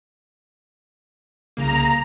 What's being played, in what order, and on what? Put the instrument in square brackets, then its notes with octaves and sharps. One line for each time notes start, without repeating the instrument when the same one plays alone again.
[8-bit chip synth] C2 C#3 A#3 [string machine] A#5